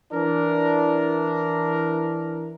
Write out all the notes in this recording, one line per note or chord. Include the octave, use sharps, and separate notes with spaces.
E3 D4 A#4